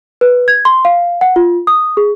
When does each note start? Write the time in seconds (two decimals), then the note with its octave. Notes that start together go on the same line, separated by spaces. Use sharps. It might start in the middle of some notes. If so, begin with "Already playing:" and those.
0.21 B4
0.48 G#6
0.65 C6
0.85 F5
1.21 F#5
1.36 F4
1.67 D#6
1.97 G#4